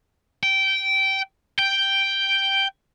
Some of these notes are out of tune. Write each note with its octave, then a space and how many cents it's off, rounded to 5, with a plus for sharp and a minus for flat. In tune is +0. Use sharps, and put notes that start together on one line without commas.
G5 -15
G5 +0